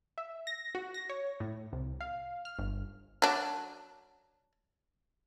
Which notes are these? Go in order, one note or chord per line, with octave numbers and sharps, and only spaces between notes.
E5
A#6
F#4
A#6
C#5
A2
C2
F5
F6
G1
F#3 D4